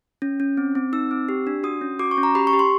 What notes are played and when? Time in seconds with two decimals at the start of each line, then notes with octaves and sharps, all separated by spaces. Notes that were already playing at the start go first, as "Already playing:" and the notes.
0.22 C#4
0.40 C#4
0.57 C4
0.75 C4
0.93 D#4 E6
1.11 C4
1.29 G4
1.47 D4
1.64 F#4 D#6
1.81 C#4
1.99 F#4 D6
2.11 C#6
2.18 C#4
2.23 A#5
2.35 G4 B5
2.47 C#6
2.53 G4
2.59 C6